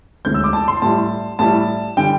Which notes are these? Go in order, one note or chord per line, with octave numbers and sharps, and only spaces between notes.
E1 D2 D3 C4 G6
E6
D6
A5
C6
A2 G3 E4 A5
A2 G3 E4 A5
D3 G3 G5